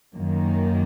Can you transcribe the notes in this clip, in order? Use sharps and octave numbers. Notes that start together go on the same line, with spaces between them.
F#2 D#3 A#3